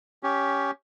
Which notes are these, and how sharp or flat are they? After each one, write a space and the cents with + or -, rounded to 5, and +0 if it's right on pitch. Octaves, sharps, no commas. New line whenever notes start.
C#4 +10 G4 +0